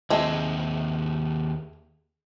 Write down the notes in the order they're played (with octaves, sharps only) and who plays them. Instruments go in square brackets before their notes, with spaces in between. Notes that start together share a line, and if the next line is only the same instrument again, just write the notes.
[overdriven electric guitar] D#2 C4 [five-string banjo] G#3 A3